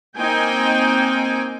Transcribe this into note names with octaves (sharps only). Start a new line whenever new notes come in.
A#3 C4 D#4 G5 G#5